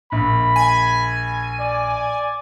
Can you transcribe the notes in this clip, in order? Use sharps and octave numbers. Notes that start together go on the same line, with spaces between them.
A#1 B5
G#5
D5